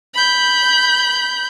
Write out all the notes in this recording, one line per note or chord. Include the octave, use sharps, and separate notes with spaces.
B5 G6